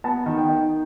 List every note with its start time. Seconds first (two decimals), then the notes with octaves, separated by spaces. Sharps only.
0.04 B3 A5
0.26 D#3
0.37 G5
0.49 D#3